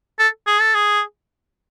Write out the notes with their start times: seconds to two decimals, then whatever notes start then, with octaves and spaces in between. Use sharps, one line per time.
0.19 A4
0.47 G#4
0.61 A4
0.74 G#4